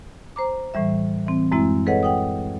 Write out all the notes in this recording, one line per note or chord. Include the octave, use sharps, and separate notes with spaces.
C5 A#5 D6
A2 E3 G3 E5
E3 C4
F#2 G#3 C4 E4 E5
G#4 A4 B4 C#5 D#5 F#5
F#5 G5 D#6